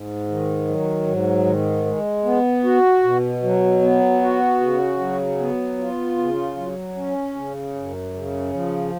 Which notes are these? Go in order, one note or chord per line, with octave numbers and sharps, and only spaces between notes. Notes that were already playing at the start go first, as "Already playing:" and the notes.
Already playing: G#2
D#3
F#3
G#2
D#3
G#3
B3
F#4
B2
F#3
B3
F#4
C#3
F#3
B3
F4
C#3
F#3
C#4
C#3
F#2
C#3
F3